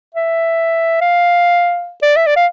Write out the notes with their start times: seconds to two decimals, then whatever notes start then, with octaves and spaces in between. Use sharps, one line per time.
0.15 E5
1.01 F5
2.02 D5
2.17 E5
2.27 D5
2.36 F5